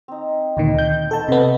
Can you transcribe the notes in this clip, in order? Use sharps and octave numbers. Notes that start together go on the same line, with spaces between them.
C4 D#4
D2 A#2 D#3 D#5
G6
A3 B3 A4 D#5 A5
C3 B3 C5 F#5 E6